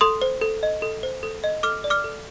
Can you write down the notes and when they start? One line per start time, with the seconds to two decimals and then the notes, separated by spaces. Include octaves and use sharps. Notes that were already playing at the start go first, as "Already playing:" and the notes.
0.01 A4 C6 D#6
0.22 C5
0.41 A4
0.63 D#5
0.82 A4
1.03 C5
1.23 A4
1.44 D#5
1.63 A4 D6 F6
1.84 D5
1.90 D6 F6
2.04 A4